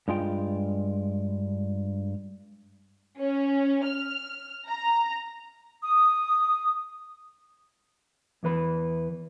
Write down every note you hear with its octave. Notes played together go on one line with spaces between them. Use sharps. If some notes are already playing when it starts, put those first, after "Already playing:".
G2 G#3 F4 G5
C#4
F6
A#5
D#6
E2 E3 B4 B5